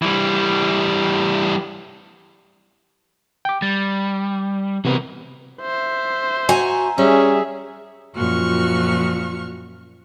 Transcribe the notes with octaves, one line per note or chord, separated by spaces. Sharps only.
E3 G3
G5 D6
G3 A6
C3 E3 B3 F#4 A#4
C5 E5
F#4 G#5 A#5
G3 C#4 G#4 E5
F#2 A#2 F3 F#4 C#6 F6